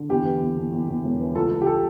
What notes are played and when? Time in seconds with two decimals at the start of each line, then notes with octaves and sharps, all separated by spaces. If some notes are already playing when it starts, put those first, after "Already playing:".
Already playing: D3
0.09 E2 G4
0.25 E3
0.41 E2
0.57 E2
0.72 E2
0.88 E2
1.04 E1
1.20 E3
1.35 C#2 A4
1.51 C#2
1.62 G4
1.67 A4